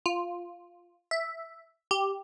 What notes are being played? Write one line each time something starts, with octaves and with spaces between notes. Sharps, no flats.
F4
E5
G4